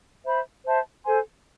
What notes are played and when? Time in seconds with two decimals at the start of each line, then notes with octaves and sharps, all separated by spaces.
0.25 C5 E5 B5
0.64 C5 E5 A5 C6
1.03 A4 C5 G#5 C6